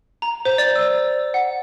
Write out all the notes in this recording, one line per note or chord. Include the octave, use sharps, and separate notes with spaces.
A#5
C5
D5
E6
F#5